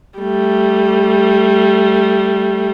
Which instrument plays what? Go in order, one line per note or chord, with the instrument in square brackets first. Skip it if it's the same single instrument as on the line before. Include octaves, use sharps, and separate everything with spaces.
[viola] G3 A3